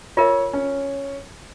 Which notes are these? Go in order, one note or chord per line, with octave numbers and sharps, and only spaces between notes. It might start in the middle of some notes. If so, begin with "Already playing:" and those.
F4 A#4 C#5 E5
C#4